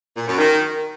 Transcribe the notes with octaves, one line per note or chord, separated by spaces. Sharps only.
A#2
F#2
D#3